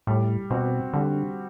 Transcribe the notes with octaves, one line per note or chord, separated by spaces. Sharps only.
A2 G3
B2 C4 F#4
D3 G3